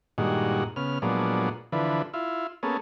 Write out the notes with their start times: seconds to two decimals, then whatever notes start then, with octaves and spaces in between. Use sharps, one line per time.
0.18 G2 A#2 D#3 G#3 F#4
0.76 C#3 B3 F6
1.02 A#2 F3 F#3 G#3 B3 D4
1.72 D3 E3 F3 B4
2.14 E4 F4
2.63 A#3 B3 C#4 G#4 A4